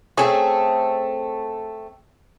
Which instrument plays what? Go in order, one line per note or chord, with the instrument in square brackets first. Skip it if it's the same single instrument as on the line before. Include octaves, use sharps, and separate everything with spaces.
[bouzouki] A3 C4 E5 [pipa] C#4 G#4